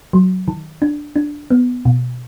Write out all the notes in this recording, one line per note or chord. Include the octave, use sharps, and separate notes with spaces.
F#3
D#3
D4
D4
B3
B2